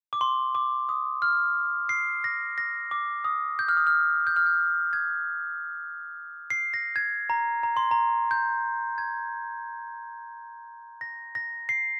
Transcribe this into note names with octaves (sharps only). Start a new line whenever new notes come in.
D6
C6
D6
D#6
F6
C7
A#6
A#6
D6
D#6
G6
F6
D#6
F6
G6
F6
G6
G#6
C7
A#6
G#6
A#5
A#5
C6
A#5
G6
G#6
A#6
A#6
C7